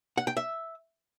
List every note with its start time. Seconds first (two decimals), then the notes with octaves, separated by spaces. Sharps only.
0.18 F#5
0.27 G5
0.37 E5